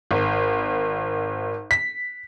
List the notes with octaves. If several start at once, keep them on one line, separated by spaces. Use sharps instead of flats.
G#1
B6